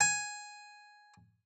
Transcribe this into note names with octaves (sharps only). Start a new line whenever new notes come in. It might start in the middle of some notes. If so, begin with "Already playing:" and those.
G#5